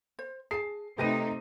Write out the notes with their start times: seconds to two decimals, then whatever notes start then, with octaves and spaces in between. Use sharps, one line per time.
0.19 C5
0.51 G#4 A5 C7
0.98 C3 A3 D#4 G4 B4 D#5 A#6 D#7